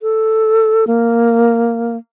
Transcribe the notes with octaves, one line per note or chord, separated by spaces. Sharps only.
A4
A#3